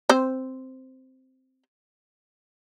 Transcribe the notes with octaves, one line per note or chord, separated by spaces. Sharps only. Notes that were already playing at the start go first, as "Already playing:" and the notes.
C4 C5